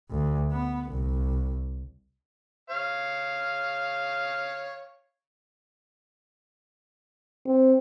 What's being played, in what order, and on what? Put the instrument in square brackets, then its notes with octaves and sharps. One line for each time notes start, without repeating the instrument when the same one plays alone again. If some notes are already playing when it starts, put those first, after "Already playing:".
[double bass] D2
B3
C2
[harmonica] C#5 F5
[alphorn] C4